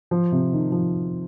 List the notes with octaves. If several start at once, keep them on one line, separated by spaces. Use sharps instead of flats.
F3
C3
D#3
F3